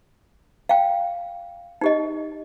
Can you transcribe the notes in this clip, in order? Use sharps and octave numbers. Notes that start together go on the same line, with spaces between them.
F5 G5
D#4 G4 D#5